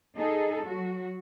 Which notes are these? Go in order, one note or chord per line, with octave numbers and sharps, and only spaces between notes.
D#4 G#4 A4
F#3 F#4